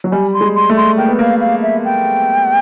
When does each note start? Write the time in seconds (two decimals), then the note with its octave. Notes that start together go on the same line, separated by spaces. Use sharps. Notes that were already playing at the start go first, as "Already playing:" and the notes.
0.04 F#3
0.12 G3 G#5
0.34 C6
0.41 G#3
0.55 C6
0.69 A3
0.77 C6
0.98 A#3 G5
1.09 B3
1.19 A#3 F5
1.41 F5
1.62 E5
1.85 G5